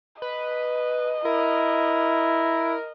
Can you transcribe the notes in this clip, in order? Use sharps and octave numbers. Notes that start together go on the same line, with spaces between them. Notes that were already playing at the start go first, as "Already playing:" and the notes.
B4 D#5
E4 A#4